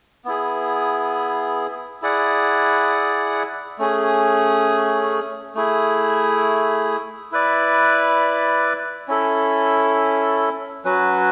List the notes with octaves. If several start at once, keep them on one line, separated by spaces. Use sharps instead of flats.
B3 E4 G#4
E4 G#4 D5 F#5
A3 C#4 G#4
A3 E4 G#4
E4 B4 D5
C#4 E4 A4
F#3 C#4 F#4 B4